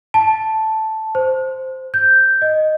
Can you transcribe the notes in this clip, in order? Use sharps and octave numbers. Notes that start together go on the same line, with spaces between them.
A5
C5
G6
D#5